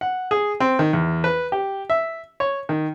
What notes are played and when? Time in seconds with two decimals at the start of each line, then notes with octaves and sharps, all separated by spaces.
0.01 F#5
0.31 G#4
0.60 C4
0.79 D#3
0.93 E2
1.24 B4
1.52 G4
1.90 E5
2.40 C#5
2.69 D#3